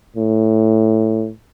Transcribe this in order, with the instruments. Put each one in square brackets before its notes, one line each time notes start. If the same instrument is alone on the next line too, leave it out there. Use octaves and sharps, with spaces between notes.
[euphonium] A2